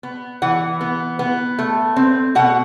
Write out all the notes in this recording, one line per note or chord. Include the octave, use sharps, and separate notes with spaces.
B3
E3 F#5
B3
B3
A3
C4
B2 F#5